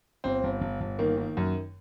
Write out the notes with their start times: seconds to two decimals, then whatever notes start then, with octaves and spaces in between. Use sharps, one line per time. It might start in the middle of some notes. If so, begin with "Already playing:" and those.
0.24 G1 C4
0.44 G1
0.61 G1
0.81 G1
0.99 D#3 A#3
1.17 D#3
1.37 F#2